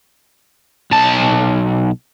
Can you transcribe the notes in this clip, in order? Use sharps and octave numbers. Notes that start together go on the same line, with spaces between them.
B1 A5